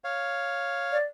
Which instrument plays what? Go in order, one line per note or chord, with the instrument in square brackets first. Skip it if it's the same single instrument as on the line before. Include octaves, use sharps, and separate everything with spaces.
[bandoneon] C#5 F5
[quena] D5